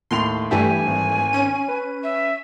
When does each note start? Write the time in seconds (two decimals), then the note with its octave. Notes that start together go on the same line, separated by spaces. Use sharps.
0.11 D#2 A2 C6 F7
0.51 G2 E3 A3 G4 G#5
0.87 G#1
1.33 C#4 D#7
1.68 B4
2.03 E5